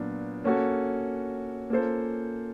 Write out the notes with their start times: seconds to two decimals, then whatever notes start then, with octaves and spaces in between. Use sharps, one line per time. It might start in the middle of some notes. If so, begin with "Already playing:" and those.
Already playing: A#2 F#3 B3 D4
0.44 A#3 C#4 F#4 A4
1.70 A#3 C#4 F4 A4 C5